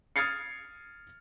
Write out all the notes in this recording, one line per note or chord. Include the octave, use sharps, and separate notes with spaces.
D#6 F6 G#6 A6 C7 C#7